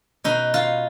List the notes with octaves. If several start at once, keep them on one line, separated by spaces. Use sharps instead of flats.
B2 D#4
F4